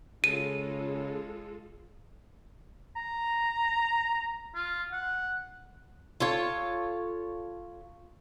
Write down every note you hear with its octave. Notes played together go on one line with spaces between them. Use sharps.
C#3 G#3 F4 A4 D#7
A#5
F4
F#5
F4 A4 C#5